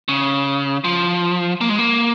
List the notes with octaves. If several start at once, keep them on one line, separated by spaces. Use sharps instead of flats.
C#3
F3
A#3
G#3
A#3